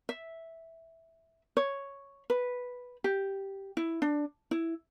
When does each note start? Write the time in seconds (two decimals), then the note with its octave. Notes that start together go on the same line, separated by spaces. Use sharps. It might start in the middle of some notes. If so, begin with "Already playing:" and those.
0.09 E5
1.57 C#5
2.30 B4
3.04 G4
3.77 E4
4.02 D4
4.51 E4